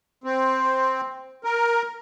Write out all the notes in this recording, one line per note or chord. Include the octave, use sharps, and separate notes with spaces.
C4
A#4